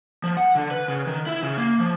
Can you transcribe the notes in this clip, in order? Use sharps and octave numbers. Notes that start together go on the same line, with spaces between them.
F3
F#5
D3
B4
C#3
D#3
E4
C#3
A#3
F3